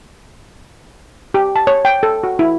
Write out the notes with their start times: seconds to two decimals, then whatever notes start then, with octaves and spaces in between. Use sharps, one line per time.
1.34 G4
1.56 A5
1.67 C#5
1.85 G5
2.03 A4
2.23 F#4
2.39 E4